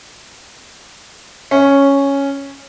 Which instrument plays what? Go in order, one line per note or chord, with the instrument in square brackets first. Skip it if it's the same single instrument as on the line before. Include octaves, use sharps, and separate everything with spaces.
[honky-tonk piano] C#4